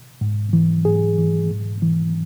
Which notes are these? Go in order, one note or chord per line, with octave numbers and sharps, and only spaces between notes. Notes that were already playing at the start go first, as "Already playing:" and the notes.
G#2
E3
G#2 G#4
E3
G#2
E3